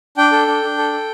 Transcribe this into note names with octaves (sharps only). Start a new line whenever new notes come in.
D4 G5
A4
D4
D4
A4
A4